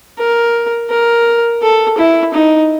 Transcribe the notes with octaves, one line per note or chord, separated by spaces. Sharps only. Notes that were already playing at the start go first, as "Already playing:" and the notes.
A#4
A#4
A4
E4
D#4